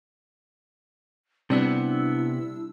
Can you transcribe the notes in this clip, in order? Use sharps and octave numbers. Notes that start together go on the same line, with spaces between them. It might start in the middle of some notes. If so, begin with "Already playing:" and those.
C3 G3 B3 C4 D4 E4 E6